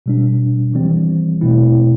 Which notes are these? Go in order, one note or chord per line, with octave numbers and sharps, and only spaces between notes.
B2 G3 D4
E3 G3 C4
B2 A3 C4 E4